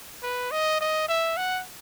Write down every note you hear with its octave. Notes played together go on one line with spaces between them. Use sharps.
B4
D#5
D#5
E5
F#5